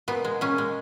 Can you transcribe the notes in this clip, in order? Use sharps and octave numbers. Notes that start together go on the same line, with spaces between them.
A#2 B3
G#3
A#2 C#4
G#3